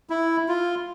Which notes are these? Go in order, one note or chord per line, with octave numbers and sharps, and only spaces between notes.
E4
F4